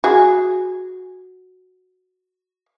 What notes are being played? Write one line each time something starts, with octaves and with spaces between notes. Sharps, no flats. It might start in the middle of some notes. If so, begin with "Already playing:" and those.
F#4 G#4